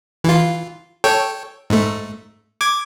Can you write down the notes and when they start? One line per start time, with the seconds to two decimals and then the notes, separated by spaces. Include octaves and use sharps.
0.24 E3 F4
1.04 A4 C#5 G5
1.70 G#2 A3
2.61 D6 G#6